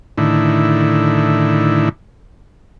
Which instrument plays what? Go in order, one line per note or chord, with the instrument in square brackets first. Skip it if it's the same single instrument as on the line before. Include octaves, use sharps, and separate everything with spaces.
[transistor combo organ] A2 D3 D#3 E4